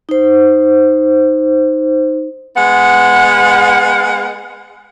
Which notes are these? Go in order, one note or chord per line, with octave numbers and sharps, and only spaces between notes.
D#4 C5
G#3 B3 F#5